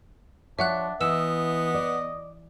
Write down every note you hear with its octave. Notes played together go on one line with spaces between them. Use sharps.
F3 D4 C#5 E5 F#5 F#6
E3 B3 D#5 E6 E7
D5